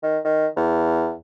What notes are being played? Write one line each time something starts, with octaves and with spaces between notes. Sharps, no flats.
D#3
D#3
E2